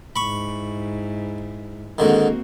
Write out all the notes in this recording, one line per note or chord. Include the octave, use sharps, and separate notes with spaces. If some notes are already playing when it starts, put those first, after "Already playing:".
G#2 E4 B5 C#6
G#2 D3 D#3 A#3 C4 F#4